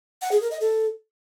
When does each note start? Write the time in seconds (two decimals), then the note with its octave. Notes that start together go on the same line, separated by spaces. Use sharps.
0.22 F#5
0.31 G#4
0.41 A#4
0.51 D#5
0.61 A4